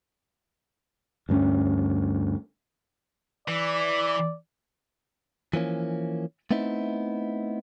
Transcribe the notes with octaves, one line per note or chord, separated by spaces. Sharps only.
D2 G2 A#3 C#4
E3 D5
E3 F3 A#3 C#4
A3 B3 C4 D#4 E4